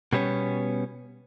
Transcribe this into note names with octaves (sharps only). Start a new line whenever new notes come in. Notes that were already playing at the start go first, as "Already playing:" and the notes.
B2 G3 B3 C#4